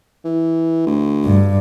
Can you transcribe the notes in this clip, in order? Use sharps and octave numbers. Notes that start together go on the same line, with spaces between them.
E3
D2
G2